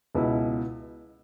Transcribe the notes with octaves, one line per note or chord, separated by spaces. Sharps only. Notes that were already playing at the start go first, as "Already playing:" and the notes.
C#2 B2 B3 E4